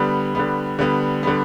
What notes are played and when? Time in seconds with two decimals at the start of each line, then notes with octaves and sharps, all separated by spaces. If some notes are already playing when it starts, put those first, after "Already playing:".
Already playing: D3 G3 B3
0.35 D3 G3 B3
0.79 D3 G3 B3
1.23 D3 G3 B3